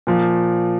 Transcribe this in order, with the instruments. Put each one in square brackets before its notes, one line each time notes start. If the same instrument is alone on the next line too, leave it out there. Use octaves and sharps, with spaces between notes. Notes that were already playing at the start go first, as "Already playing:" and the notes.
[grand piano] A#2 F3